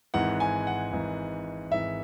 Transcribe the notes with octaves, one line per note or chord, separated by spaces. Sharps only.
G#1 G#2 E3 F#5
G#5
F#5
G#1 G#2 E3
G#1 G#2 E3 E5